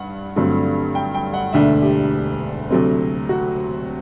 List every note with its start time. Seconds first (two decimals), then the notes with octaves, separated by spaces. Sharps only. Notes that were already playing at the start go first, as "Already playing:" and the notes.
Already playing: G2 F#5
0.36 G2 D3 F#3 A3 C4
0.95 G5
1.14 G5
1.34 F#5
1.53 E1 D2 D3 A3 D4 E5
1.82 G4
2.70 D2 C3 F#3 A3 C4
3.29 F#4